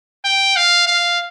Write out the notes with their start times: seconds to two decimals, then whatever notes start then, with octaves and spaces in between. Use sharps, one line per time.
0.25 G5
0.56 F5
0.87 F5